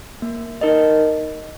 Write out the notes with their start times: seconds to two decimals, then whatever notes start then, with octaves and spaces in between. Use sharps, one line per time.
0.22 A#3
0.61 D#4 A#4 D#5